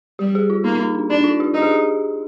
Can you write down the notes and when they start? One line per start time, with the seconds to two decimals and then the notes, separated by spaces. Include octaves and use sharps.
0.19 G3 G4
0.35 G#4
0.50 F4
0.64 A#3 D#4
0.80 D#4
0.95 D4
1.10 D4 D#4
1.24 F4
1.40 G4
1.54 D#4 G4
1.62 G#4
1.71 G4